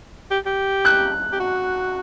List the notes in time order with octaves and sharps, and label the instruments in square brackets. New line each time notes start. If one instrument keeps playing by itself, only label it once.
[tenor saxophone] G4
G4
[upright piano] F#6
[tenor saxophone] G4
F#4